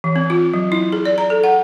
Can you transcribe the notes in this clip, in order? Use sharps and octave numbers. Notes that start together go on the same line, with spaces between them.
E3
C4
F4
F#3
E4
G#4
D5
A#5
A4
F#5